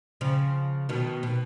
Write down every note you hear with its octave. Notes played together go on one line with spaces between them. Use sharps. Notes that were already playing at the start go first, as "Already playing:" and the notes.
C#3 F3
B2 D#3
B2